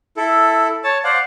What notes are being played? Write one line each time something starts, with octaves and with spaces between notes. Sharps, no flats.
E4 A4
C#5 A5
C5 D5 F5 F#5